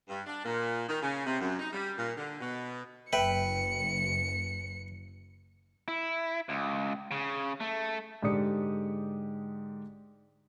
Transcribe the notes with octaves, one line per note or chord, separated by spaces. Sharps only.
G2
D4
A#2
D#3
C#3
C3
F#2
D#4
G3
A#2
D3
B2
F#1 B4 E5 G5 C#7
E4
C#2
C#3
A3
G#2 D3 G4 D5 D#6 C#7